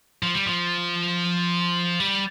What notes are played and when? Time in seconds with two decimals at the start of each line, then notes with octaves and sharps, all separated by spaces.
0.23 F3
0.35 G3
0.46 F3
2.00 G3